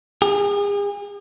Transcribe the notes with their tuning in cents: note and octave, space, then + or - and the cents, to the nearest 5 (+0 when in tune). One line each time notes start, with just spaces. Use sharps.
G#4 -40